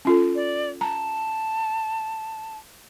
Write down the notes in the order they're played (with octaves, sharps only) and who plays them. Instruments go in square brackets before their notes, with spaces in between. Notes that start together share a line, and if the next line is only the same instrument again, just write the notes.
[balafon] C#4 F4 A4
[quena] D5
[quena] A5 [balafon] A#5